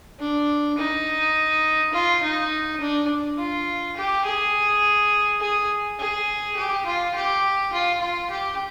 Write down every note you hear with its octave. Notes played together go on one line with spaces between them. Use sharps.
D4
D#4
F4
D#4
D4
F4
G4
G#4
G#4
G#4
G4
F4
G4
F4
F4
G4